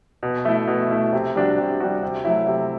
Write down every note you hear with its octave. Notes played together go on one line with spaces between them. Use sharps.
B2
A3 E4
B2
A3 E4
C3
G3 D4 F#4
C3
G3 D4 F#4
C3
F#3 A3 E4
C3